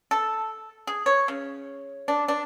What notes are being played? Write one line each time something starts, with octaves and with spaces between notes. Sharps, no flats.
A4
G#4
C#5
C#3
D4
D4